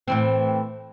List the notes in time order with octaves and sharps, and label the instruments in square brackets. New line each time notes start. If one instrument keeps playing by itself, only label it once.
[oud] A2 E3 C4